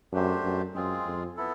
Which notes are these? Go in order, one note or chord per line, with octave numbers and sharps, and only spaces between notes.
F#2 A3 D4 G4 C5
F#2
F#2 G#3 C4 F4 G#4
F2
B3 E4 A4